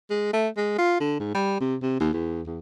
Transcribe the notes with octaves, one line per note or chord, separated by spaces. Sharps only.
G#3
A3
G#3
F4
D3
G#2
G3
C3
C3
D#2
E2
E2